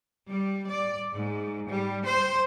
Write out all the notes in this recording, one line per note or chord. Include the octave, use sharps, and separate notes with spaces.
G3
D5
G#2
G3
C5